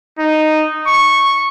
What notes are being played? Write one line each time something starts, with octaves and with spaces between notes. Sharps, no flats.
D#4
C#6